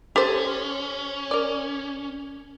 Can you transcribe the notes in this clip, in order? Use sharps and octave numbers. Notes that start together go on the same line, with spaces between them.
C#4 G4 A4 C5
A#4 D5